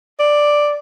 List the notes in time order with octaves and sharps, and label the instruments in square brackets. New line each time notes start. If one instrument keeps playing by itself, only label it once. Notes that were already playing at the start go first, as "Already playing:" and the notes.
[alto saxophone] D5